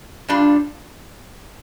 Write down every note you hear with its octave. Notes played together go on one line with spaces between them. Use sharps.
G2 G3 D4 F4